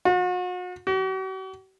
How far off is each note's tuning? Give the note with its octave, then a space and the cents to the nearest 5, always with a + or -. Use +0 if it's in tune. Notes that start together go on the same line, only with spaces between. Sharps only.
F#4 -40
F#4 +45